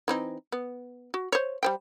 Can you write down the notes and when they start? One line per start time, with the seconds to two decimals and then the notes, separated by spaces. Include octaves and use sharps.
0.08 E3 C4 D#4
0.52 B3
1.14 F#4
1.32 C5 C#5
1.63 G3 C5 G5